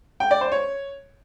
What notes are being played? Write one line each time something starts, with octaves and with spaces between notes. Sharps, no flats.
G5
D5
C5
C#5